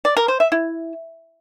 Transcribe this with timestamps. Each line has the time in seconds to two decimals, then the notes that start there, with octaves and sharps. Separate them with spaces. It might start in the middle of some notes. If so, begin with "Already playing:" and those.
0.05 D5
0.17 A#4
0.28 C5
0.40 E5
0.52 E4